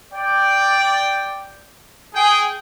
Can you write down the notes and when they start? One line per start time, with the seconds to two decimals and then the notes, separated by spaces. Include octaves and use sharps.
0.13 D5 G5
2.15 G#4 G5